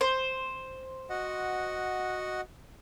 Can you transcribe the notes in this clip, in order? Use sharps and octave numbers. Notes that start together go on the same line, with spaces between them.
C5
F#4 D#5 F#5